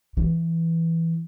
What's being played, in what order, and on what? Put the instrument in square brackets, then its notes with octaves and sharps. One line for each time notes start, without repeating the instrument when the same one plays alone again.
[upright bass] E3